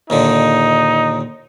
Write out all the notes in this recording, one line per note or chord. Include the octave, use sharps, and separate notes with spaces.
D#2 A#2 D3 D#4